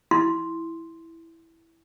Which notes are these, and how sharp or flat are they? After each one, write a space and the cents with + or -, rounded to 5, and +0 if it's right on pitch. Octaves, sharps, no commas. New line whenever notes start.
E4 -5 C6 +0